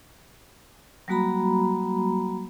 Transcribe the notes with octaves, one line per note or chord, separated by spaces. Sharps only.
F#3 G3 A#3 F#4 A#5 B5